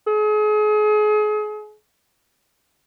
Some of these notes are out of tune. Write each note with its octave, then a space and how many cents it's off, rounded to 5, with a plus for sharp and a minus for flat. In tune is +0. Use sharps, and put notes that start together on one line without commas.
G#4 +35